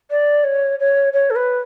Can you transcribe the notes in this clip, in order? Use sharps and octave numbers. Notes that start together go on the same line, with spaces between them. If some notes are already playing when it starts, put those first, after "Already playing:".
D5
C#5
C#5
C#5
A4
B4